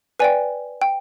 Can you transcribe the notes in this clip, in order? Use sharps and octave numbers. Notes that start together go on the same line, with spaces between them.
B4 D5 G5 G#5
G5